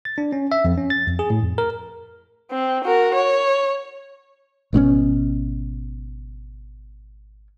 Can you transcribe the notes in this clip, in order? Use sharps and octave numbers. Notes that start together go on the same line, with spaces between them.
A6
D4
C#4
E5
F2
C#4
A6
F2
G#4
A2
F2
A#4
C4
F#4 A#4
C#5
G#1 B2 C4 C#4